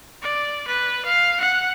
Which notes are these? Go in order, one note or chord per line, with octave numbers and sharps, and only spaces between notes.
D5
B4
F5
F#5